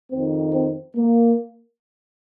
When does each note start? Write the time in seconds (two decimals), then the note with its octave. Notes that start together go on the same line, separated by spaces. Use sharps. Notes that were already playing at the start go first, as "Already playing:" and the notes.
0.11 F2 D#3 C4
0.54 C4
0.96 A#3